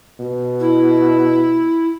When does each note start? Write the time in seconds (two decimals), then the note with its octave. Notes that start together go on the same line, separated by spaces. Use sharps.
0.19 B2
0.60 E4